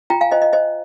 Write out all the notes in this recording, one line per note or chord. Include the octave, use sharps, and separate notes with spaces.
F4 G5 A#5
F5 G#5
C5 D#5
D#5
C5 D#5